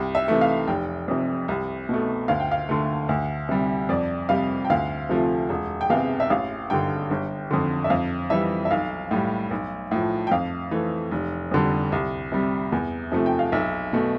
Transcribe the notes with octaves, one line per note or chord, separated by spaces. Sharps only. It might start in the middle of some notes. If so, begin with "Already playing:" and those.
Already playing: C2 G5
E5
C3 E3 A3
F5
F1 G5
F2 C3
C2
B2 A3
D2 F5
G5
F5
D3 A3
D2
C3 G3
F2 D5
C3 G3 F5
G5
D2 F5
C3 F3 A3
E1
G5
E2 C3 F5
E5
A1 F5
G2 D3 G5
G1
F2 D3
E5
F2 F5
E3 G3 E5
E5
B1 F5
A2 G3
B1
A2 F3
G5
F2 F5
E3 A3
F1
F2 D3 G3
C2
C3 G3
E2
C3 F3 A3
G5
F5
B1 E5
B2 A3